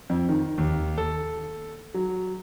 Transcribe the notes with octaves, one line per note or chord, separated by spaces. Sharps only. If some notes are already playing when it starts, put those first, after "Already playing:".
F2
D#3
D#2
A4
F#3